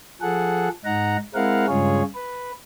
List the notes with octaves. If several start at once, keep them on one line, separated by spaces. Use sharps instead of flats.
F3 G#4 A4 F#5
G#2 D#4 F#5 A#5
G#3 C4 E4 A#4 F5 F#5
G2 C#3 G#3 F4 G#4 C#5
B4